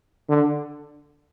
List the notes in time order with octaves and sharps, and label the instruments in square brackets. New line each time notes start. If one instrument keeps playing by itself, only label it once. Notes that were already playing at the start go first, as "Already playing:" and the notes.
[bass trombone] D3